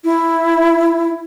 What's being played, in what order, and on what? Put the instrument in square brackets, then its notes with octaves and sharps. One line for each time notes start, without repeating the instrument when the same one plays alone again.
[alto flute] E4